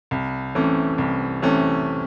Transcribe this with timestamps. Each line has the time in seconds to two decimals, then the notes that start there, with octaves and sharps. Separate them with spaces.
0.11 C2
0.55 C3 E3 A3 C#4
0.98 C2
1.42 C3 E3 A3 C#4